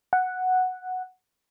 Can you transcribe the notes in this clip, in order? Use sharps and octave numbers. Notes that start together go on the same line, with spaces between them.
F#5